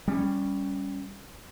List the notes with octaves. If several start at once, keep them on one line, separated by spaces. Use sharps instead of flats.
G3 C#4